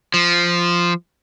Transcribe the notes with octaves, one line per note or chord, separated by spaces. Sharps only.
F3